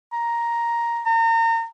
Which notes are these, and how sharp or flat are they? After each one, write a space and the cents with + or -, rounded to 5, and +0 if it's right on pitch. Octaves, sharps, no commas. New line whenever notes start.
A#5 +5
A#5 -35